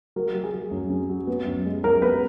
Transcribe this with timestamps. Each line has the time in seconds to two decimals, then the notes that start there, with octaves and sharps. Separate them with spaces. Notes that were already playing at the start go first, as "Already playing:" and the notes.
0.16 F#3 A#4
0.35 F#3
0.43 G#4
0.54 F#3
0.71 F#2
0.90 C#4
1.09 F#3
1.27 B3
1.46 F#2
1.66 G#3
1.83 F#2 A#4
2.02 B3 B4